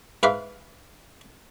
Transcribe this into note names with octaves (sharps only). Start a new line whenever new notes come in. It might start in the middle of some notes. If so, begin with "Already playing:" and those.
G#2 B4 E5 F5 D6